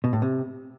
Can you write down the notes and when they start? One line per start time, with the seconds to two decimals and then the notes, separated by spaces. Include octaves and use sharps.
0.04 B2
0.13 A2
0.22 C3